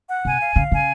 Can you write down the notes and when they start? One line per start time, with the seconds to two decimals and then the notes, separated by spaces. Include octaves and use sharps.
0.09 F#5
0.25 C3 G#5
0.41 F5
0.56 C#3 F5
0.72 C#3 G#5